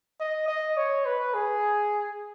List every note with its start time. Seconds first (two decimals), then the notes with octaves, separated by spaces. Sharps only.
0.20 D#5
0.48 D#5
0.77 C#5
1.06 B4
1.34 G#4